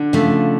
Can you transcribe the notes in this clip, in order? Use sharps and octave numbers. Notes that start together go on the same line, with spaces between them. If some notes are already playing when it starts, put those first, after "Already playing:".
Already playing: D3
C#3 F3 A3